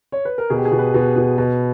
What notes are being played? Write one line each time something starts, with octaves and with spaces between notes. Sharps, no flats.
C#5
B4
A#4
B2 G#4
G4
G#4
B2
B4
B2
B2
B2